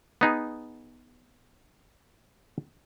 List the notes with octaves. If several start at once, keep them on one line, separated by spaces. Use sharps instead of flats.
B3 D#4 G#4